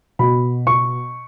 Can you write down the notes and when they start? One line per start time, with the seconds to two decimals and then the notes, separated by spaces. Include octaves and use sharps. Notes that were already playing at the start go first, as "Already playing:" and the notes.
0.19 B2 B5
0.67 C#6